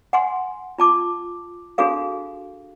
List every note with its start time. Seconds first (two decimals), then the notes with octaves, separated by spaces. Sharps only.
0.13 F#5 G#5 C6
0.78 F4 A5 D6
1.78 D4 F#4 G#4 A4 F5